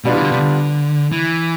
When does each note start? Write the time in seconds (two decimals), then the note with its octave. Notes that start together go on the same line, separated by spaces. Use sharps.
0.04 B2 G3 B3 D4 F4
0.14 E3
0.22 D3
0.32 C3
0.41 D3
1.12 E3